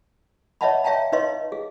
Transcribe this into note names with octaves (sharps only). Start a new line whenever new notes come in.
C#5 D#5 E5 F#5 A5 B5
C#5 E5 F5 G5 A5 A#5
D#4 B4 C#5 D#5 F5 C6
G#4